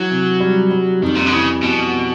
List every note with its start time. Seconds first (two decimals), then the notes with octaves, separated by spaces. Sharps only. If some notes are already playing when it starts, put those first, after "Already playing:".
Already playing: E3 F#3
0.11 C3
0.40 G3
0.71 G3
1.02 F2 D#3
1.17 A#2
1.26 D3
1.32 C#3 E3
1.63 F2 B2